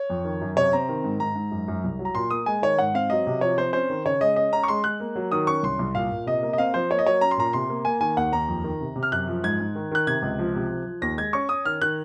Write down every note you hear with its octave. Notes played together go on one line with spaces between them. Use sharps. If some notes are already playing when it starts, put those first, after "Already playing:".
Already playing: C#5
F2
D#3
F#2
C3 C#5
C4 A#5
D#3
G#2
G#2 A#5
G#2
F#2
F#2
C2
F#3
A#5
A#2 C6
A#3 D#6
G#3 G#5
D#3 C#5
G#2 F#5
C4 F5
F#3 D#5
C3
F3 C#5
C4 C5
C#4 C5
D#3
C#3 C#5
G#3 D#5
C#4 D#5
C#4 A#5
C#6
G#3 C6
G#3 F#6
A#3
F#3
D#3 D#6
C#4 C#6
C2 C6
C2
A#2 F5
A#2
C3 D#5
A#3
D#5
C4 F5
F3 C5
A#3 C#5
D#5
F#3 C#5
C#4 A#5
C6
A#2 A#5
C3 C6
A#3
A#3 G#5
D#3 G#5
D#2 F#5
D#2 A#5
F2
D#3
C3
C3
F6
F#2 F#6
F3
G#2 G#6
G#2
D#3
D#3 F#6
C3 G#6
C#2
F3
C3
F3
F3
D#2 A#6
G#3 G#6
C#4 C#6
C#4 D#6
D#3 F6
D#3 F#6